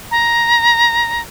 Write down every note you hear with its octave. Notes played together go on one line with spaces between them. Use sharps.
A#5